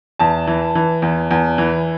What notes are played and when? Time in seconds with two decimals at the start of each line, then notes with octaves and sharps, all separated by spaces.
0.19 E2 A5
0.47 E3
0.75 E3
1.02 E2
1.31 E2
1.58 E3